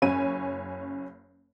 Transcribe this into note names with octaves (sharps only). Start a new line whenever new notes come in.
F#1 C#4 C#5 G#5 D#7